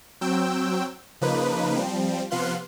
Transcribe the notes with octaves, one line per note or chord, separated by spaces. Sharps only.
F#3 C4 G5 E6
C#3 F3 A#3 D#4 B4
F3 G3 C4
C3 F3 B3 F5 C6 F#6